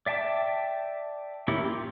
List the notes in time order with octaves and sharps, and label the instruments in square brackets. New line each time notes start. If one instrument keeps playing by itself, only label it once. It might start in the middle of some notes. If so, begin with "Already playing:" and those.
[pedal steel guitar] D5 E5 G5 A5 D6
A#3 C#4 E4 G4
F4 G4